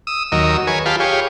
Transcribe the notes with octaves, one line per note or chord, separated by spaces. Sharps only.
D#6 E6
D#2 F#3 A#4 D#5 E6
G#4 A#4 B4 C#5 G#5
F4 G4 F5 A5 B5
G4 G#4 C#5 F5